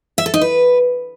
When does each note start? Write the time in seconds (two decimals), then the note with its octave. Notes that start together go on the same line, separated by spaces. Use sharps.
0.18 E5
0.26 A4
0.34 D#4
0.41 B4